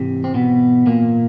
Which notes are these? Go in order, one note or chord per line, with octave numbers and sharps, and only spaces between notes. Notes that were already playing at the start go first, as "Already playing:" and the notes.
Already playing: G#2 C3 E3
C4
B2 B3
A#2 A#3